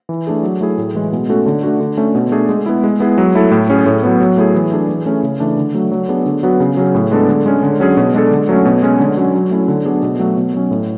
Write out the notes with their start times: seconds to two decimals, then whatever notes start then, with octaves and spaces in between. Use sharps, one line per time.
0.09 E3
0.27 A3 D4 G#4
0.43 F#3
0.61 A3 E4 G#4
0.78 A2
0.95 E3 G#3
1.12 B2
1.29 A3 C#4 F#4 A4
1.46 D3
1.63 A3 D4 F#4
1.80 D3
1.97 A3 C#4
2.15 B2
2.32 A3 D4 G#4
2.49 G#3
2.66 B3 E4
2.84 G#3
3.00 B3 E4 G#4
3.18 F#3
3.35 A3 E4 A4
3.51 A2
3.69 F#3 C#4 G#4
3.86 A2
4.03 F#3 B3
4.20 F#3
4.37 A3 E4 G#4
4.55 E3
4.72 A3 D4 G#4
4.89 E3
5.06 A3 C#4 G#4
5.23 C#3
5.40 E3 A3 D4
5.57 D3
5.74 F#3 A3
5.91 F#3
6.09 B3 D4 G#4
6.26 D3
6.43 F#3 B3 F#4
6.60 C#3
6.77 F#3 C#4 G#4
6.95 A2
7.11 G#3 B3 D4 A4
7.29 D3
7.46 G#3 C#4
7.63 D3
7.80 F#3 C#4 G#4
7.97 B2
8.14 G#3 D4 A4
8.31 D3
8.49 F#3 A3 C#4
8.65 B2
8.83 G#3 C#4
9.00 D3
9.17 F#3 C#4
9.34 F#3
9.51 A3 C#4 E4
9.68 D3
9.85 F#3 B3 D4 G#4
10.03 B2
10.20 F#3 A3
10.37 B2
10.54 F#3 C#4
10.71 A2